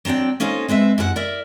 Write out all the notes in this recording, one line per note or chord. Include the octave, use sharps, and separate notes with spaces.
F#3 C4 D4 D5 G5
A#3 C#4 D#4 F4 A4 C5
G#3 C4 B4 E5
F#2 E4 A#4 F#5
A#4 D5 E5